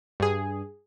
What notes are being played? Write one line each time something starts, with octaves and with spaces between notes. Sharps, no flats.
G2 G#4